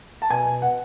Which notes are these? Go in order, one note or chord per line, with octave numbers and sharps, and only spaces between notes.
A5
B2 G#5
B2
B2 F#5